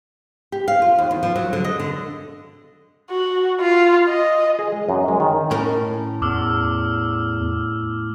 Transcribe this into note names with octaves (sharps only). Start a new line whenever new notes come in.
G4
F5
F4
D#2
E2
F3
F#3
D3
D#5
D3
F#4
F4
D#5
G#4
G#3
F#2
G#3
D#3
A2 C#4 A#4
E2 D6 E6 F6